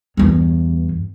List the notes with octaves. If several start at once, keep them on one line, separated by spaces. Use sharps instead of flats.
E2 G2